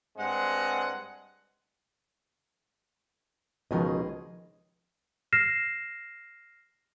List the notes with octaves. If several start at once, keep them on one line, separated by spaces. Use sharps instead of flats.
G2 G#3 C4 D#5 F#5
C#2 B2 D#3 F3 G#4 D#5
F6 A#6 C7 E7